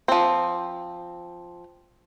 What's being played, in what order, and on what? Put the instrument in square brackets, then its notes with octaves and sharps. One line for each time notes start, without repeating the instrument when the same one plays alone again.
[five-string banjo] F3 C4